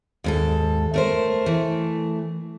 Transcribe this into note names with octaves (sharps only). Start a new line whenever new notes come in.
D#2 G#2 A4
A3 A#4 C5
E3 A3